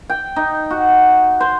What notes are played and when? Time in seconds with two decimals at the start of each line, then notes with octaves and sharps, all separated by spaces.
0.10 G5
0.36 D#4
0.70 F#4
1.40 C5